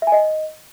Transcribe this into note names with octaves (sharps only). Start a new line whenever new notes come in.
E5
G#5
D#5